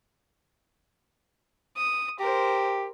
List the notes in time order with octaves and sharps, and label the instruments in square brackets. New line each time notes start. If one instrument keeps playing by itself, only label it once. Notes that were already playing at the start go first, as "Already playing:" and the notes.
[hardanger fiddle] D#6
[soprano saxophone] G4 [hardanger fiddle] A#4 C5